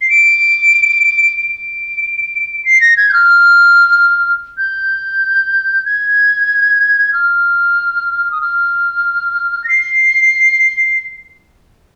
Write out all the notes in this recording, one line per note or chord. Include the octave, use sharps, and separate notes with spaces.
C7
D7
D7
C7
A#6
G#6
G6
F6
G6
G#6
F6
D#6
F6
A#6
C7